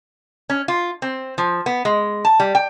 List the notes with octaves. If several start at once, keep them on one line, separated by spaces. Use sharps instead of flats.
C#4
F4
C4
F3
B3
G#3
A5
G3
G5